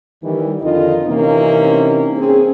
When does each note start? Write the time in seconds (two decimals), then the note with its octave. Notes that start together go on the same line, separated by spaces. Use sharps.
0.23 D#2 E3 G3
0.62 F2 D3 D#3 D#4 F4 D#5
1.08 C3 E3 A#3 C4 C#4 D#4
2.18 C4 C#4 G#4